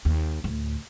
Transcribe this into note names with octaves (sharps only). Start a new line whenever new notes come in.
D#2
D2 A2